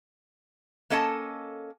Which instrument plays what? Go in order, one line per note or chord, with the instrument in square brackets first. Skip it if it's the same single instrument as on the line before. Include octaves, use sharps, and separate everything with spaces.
[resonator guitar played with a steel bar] A#3 C#4 A4 D#5 G5 A5